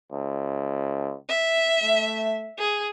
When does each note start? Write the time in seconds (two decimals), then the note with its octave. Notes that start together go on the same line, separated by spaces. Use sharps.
0.12 C#2
1.29 E5
1.82 A3
2.59 G#4